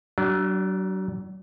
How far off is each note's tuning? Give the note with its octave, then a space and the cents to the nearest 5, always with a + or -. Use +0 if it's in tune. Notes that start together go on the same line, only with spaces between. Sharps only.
F#3 +35 D4 -10